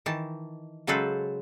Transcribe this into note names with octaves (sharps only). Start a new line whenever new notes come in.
D#3 E3 A5
C#3 F#3 G#3 A4 B4 C5